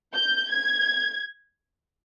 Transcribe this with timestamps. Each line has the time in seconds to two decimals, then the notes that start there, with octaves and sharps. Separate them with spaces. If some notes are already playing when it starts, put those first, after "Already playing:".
0.14 G6
0.50 G#6